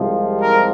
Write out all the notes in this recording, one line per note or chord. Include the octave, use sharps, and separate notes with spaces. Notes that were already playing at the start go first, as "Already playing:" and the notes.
Already playing: C2 C3 F3 G#3
A#4